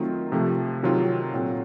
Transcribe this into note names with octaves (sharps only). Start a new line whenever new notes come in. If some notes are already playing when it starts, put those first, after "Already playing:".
Already playing: D#3 F#3 A3 C4 F4
C3 F3 A3
C3 D#3 F#3 C4 F4
A#2 F#3 C4 F4 A4